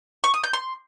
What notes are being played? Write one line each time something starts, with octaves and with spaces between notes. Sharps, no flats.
C#6
D#6
G6
C6